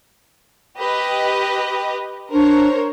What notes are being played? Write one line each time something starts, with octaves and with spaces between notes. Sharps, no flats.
G4 B4 D#5
D4 A#4 C5 C#5